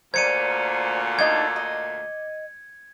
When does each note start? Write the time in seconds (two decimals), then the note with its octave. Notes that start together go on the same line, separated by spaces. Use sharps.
0.14 D2 A#2 C5 D5 G#6 C#7 D#7
1.19 D4 D#4 A4 D6 G#6
1.56 D#5